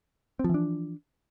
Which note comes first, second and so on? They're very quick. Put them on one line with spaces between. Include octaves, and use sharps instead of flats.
C4 F3 E3 D4